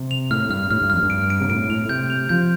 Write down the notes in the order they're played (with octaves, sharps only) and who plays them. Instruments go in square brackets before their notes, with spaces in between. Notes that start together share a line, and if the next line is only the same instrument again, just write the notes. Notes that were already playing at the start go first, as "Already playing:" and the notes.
Already playing: [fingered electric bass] C3
[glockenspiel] F7
[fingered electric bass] A2 [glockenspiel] F6
[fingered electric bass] G2 [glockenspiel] F6
[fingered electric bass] A2 [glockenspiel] F6
[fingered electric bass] G2
[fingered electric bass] F2 [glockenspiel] F6
[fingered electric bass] G2
[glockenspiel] D7
D7
[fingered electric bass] C3
[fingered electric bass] A2 [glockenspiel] D7
[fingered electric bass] A2 [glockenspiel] F7
[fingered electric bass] C3 [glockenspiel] G6
[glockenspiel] F7
[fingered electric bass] F3 [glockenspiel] G6